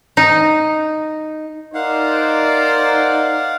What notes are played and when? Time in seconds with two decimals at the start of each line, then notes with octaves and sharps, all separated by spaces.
0.17 D#4
1.75 D#4 A#4 C5 D5 F5 F#5